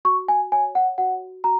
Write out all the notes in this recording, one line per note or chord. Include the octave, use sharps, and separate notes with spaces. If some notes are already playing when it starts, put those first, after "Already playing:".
F#4 C#6
G#5
C#5 G#5
F#5
F#4 F#5
F#4 A#5